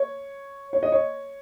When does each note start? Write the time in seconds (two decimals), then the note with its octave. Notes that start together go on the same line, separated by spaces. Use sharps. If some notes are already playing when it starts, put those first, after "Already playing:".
Already playing: C#5
0.73 C#5
0.83 D#5
0.92 C#5